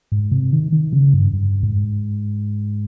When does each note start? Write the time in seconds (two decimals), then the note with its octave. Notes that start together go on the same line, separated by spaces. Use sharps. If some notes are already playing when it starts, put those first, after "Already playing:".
0.12 G#2
0.32 C3
0.52 D#3
0.72 D#3
0.93 C#3
1.14 G2
1.33 G2
1.63 G#2